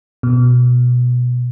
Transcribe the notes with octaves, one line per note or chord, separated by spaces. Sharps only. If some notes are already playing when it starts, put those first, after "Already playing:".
B2